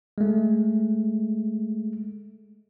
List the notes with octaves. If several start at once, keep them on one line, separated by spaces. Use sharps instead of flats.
G#3 A3